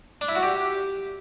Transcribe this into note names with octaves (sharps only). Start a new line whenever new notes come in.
D4
E4
F#4
G4